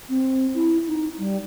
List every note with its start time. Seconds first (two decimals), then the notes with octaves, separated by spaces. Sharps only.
0.09 C4
0.54 E4
0.87 D#4
1.18 G3